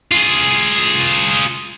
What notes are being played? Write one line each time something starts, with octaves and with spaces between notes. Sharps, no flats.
F4 G#4